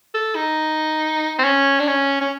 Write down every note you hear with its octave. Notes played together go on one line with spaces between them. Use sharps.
A4
D#4
C4
C#4
D4
C#4
C#4